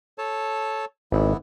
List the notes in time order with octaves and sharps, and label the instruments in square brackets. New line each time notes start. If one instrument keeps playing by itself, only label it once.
[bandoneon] A4 C#5 A5
[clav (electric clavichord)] G#1 [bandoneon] E3 B3 E4